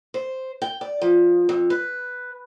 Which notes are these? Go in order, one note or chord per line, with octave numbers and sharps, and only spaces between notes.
C5
G5
D5
F3
F2
B4